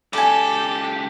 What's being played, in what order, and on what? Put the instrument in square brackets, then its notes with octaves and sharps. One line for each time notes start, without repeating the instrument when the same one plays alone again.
[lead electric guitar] C#2 G4 [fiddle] A4 [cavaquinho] D5 G#5